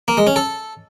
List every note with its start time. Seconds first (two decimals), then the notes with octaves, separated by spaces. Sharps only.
0.08 A#3
0.17 G#3
0.27 C#4
0.36 A4